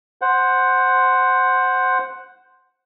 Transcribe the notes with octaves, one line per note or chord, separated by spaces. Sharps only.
C5 F#5